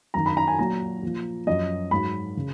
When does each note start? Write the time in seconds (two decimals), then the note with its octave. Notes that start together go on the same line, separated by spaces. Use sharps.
0.14 F#2 D#3 F#3 A#5
0.26 B5
0.37 A#5
0.48 G#5
0.59 A#2 F#3 A#5
1.03 A#2 F3
1.47 F#2 F3 D#5
1.91 G#2 F#3 B5
2.37 C#3